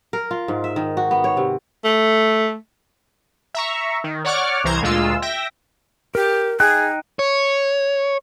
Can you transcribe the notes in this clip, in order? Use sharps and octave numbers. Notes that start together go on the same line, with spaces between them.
A#4
F4
G#2
E5
D#3
F#4
B3
C#5
C3
A3
E5 A#5 C#6
D#3
C#5 D5 F#5 C#6 D6 F6
C2 E3 C5 A#5 G#6
D2 A#2 G#3 F4 E6
E5 G5 A#6
G4 A#4
D#4 G#4 G5 F#6
C#5